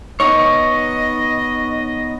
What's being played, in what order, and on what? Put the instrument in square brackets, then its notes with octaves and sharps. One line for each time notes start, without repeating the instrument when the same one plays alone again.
[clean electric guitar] B3 D#4 C#5 [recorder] D#5